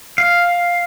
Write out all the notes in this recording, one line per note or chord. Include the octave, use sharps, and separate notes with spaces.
F5